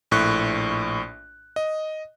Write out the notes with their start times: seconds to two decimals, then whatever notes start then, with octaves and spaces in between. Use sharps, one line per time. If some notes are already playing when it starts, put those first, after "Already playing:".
0.11 A#1 A2 C#6 F#6
1.56 D#5